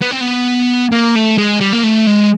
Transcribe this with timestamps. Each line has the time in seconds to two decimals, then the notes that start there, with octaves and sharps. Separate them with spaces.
0.01 B3
0.11 C4
0.21 B3
0.92 A#3
1.15 A3
1.38 G#3
1.61 G3
1.73 A#3
1.84 A3
2.07 G#3